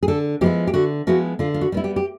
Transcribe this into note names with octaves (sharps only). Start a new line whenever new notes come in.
G#4
D3 A4
F3 G#3 B3 E4 G4
G4
D3 F#4
F3 G#3 B3 E4 F#4
D3 F4
F4
F#4
G3 B3 E4
G4
G4